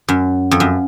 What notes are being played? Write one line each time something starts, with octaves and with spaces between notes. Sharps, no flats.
F#2
F2
F#2